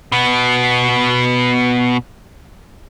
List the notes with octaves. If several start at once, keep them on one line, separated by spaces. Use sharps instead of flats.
B2 B3